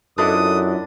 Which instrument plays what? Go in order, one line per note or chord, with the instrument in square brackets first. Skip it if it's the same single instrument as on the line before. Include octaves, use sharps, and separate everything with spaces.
[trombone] F#2 [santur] D4 B4 D#5 [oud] E4 F4 A4 [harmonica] D#6